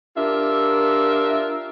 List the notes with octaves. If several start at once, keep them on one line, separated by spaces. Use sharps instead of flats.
D4 F4 G4 A#4 E5